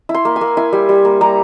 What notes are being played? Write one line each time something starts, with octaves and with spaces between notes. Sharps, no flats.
E4
C6
A#3
G#5
A#3
E4 G#5
G3
G3
A#3
G3 A#5